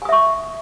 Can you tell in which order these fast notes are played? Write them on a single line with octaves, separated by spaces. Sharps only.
G#5 D#6 E5 C#6